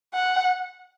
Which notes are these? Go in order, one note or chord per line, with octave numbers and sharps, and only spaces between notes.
F#5